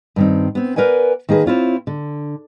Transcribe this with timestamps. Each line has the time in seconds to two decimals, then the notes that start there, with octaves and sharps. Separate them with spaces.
0.16 G2 D#3 C4
0.55 B3 C4
0.76 A#4 B4 D5 F#5 G#5
1.29 D#3 A#3 G#4 A#4 B4
1.46 C4 E4 F4 C#5
1.87 D3